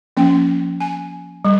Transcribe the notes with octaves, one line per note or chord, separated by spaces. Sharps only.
F3 A#3 C#4 G5
G#5
G3